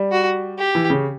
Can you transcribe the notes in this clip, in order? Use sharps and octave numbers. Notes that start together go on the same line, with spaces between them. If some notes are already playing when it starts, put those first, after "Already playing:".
Already playing: G3
F#4
G4
E3
C#3